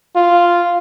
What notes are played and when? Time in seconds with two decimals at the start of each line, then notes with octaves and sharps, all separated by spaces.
0.16 F4